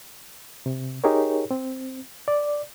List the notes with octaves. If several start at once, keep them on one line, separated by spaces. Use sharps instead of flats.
C3
D#4 G4 G#4 A#4 C#5
C4
D5